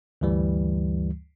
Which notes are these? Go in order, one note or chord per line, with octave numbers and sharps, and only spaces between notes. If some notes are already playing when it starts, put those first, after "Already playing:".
D2 G2 E3 G3